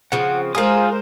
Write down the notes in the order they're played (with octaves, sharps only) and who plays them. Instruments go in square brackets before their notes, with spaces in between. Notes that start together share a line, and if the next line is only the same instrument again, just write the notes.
[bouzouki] C#3 F3 C4 [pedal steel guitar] F#5
[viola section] G#3 A#4 C5 [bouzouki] F4 G#4 [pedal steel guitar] F5 D#6